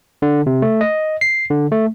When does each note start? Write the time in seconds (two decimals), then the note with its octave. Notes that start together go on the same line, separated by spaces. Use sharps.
0.22 D3
0.46 C3
0.62 A3
0.81 D#5
1.21 C7
1.50 D3
1.72 A3